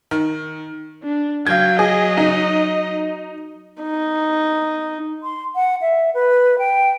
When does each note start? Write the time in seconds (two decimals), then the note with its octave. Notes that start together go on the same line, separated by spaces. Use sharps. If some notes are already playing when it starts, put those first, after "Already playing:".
0.11 D#3
1.03 D4
1.47 F#3 F5 G5 G#6
1.79 G#4 D#5
2.17 D#4
3.82 D#4
5.23 C6
5.55 F#5
5.82 E5
6.14 B4
6.59 G5